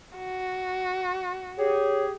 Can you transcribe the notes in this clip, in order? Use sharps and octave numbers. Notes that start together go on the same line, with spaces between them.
F#4
G4 G#4 C#5